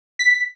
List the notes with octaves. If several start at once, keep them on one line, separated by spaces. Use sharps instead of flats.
B6